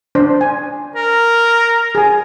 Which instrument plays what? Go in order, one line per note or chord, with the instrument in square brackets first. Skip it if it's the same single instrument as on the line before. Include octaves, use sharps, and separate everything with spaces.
[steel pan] D4 C5
G#5
[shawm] A#4
[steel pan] G#4 G#5